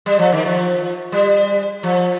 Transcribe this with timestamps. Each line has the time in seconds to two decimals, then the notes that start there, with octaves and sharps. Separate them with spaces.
0.06 G3
0.19 F3
0.32 D#3
0.45 F3
1.12 G3
1.83 F3